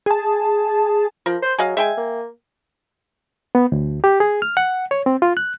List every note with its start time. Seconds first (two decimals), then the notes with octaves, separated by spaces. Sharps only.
0.06 G#4 A5
1.26 F3 A#4
1.42 C5
1.58 F#3 G#4 D#5 F5
1.77 G#3 E5 G5 G#5
1.97 A#3
3.55 B3
3.72 D2
4.04 G4
4.20 G#4
4.42 F6
4.57 F#5
4.91 C#5
5.06 C4
5.22 F4
5.37 F#6